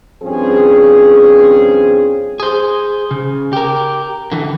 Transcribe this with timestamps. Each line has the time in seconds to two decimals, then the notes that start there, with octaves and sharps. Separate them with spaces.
0.23 G2 F3 C4 C#4 G#4
2.40 G#4 C5
3.11 C#3
3.53 G4 A#4
4.32 D3 E3